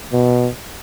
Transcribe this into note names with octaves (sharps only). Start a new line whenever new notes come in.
B2